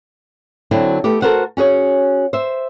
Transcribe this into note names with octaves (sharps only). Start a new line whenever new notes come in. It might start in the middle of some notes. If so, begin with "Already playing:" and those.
D3 F#3 C4 E4 F#4
A3 B3 G4
F#4 A4 A#4 C5 F#5
C#4 F#4 G#4 C#5
C5 E5